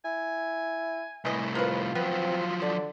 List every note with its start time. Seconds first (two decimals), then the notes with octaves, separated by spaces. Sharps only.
0.05 E4 G#5
1.25 C2 A2 E3 D#5
1.55 F2 A#3 F4 B4
1.95 F3 F#3 B3 C4
2.62 D3 D5